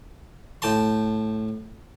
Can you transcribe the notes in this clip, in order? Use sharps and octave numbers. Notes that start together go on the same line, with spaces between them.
A2 G5 A5 C6